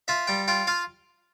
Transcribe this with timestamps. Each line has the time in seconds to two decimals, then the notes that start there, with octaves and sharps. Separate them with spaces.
0.08 F4 E5
0.27 G3 G5
0.48 F4 G5
0.67 F4 F5